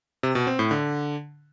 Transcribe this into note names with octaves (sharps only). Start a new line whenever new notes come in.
C3
B2
C4
A2
D3